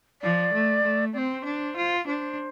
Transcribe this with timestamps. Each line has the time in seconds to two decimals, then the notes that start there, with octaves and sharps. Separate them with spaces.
0.22 F3 D5
0.53 A3
0.82 A3
1.13 C4 C5 D5
1.44 D4
1.75 F4
2.06 D4 C5